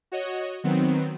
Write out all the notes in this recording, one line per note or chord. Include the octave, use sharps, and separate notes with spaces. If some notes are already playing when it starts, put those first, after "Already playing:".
F#4 C#5 D#5
D#3 F#3 B3 C4